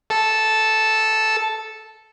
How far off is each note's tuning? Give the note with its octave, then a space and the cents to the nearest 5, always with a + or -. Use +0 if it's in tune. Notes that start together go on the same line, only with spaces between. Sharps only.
A4 -5